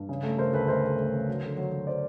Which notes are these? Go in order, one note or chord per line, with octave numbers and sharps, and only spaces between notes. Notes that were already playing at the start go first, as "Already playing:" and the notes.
Already playing: G2
C#3
A3
C#3 A#4 C5
D2 A4 B4
A3 A#4 C5
A3
A3
C#3
F#3
D3
F#3
F#3
C5 D5